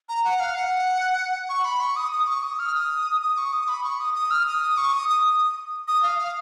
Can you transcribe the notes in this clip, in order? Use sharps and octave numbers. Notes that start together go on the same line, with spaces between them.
A#5
F#5
F5
F#5
C#6
B5
C#6
D#6
D#6
C#6
D#6
F6
D#6
D#6
C#6
D#6
B5
C#6
D#6
D#6
F6
D#6
C#6
D#6
D#6
D#6
F5
F5